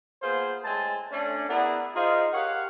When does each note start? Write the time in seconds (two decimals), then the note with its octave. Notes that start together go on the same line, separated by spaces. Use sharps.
0.22 A#3 B3 F4 G#4 C5
0.64 A2 G#3 C4 G#5 A5
1.12 A3 C#4 D4
1.48 B3 E4 G#4 A#4 D5 F#5
1.95 D#4 F4 G#4 C5 D#5 F5
2.33 G4 A#4 C#5 F5 F#5